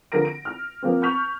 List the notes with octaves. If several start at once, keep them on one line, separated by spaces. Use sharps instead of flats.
D3 F3 A#4 A#6 D7
D7
F6
F3 A#3 C4
A5 C#6 F6 G6 B6 F7